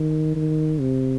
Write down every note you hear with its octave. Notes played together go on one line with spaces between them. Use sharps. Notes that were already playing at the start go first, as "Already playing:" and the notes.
Already playing: D#3
D#3
C3